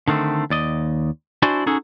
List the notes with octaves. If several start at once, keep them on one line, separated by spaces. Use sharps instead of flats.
D3 D#3 A3 C4
D#2 D5 D#5
D4 E4 F#4 C5 D5 G#5
C#4 D#4 F#4 G#4 A4